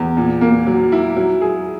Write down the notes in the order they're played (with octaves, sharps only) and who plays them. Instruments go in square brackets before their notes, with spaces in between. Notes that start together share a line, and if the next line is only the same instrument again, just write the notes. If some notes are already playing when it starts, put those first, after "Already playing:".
Already playing: [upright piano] E2
A#2
A#3
F#3
E4
F#3
G#4